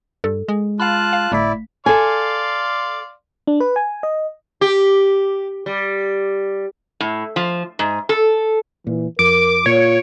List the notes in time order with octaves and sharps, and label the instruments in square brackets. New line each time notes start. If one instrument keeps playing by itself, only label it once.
[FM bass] G2 [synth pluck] A4
[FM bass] G#3
[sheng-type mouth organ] F4 A5 F#6 [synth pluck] F5 B5
[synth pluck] F5
[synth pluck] G1 A3 B6 [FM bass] A2 [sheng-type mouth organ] E4 D5
[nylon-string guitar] A4 G#5 [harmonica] D5 F5 C6
[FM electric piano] D4
B4
G#5
D#5
[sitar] G4
G3
[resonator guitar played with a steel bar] A2
F3
G#2
A4
[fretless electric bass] A#2 [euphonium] E3
[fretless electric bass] F2 [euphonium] A#4 [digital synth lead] D6 [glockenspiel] D7
[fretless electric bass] A#2 [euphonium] F4 [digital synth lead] C#5